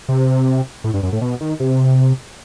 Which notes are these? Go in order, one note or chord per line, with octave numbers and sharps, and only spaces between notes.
C3
A2
G2
F#2
A2
B2
D#3
C3